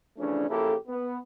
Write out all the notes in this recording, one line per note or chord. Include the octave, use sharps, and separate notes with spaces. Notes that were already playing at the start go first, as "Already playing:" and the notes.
C#3 E3 F3 A3 C#4 D4
C#3 F3 A#3 E4 G4 A4
B3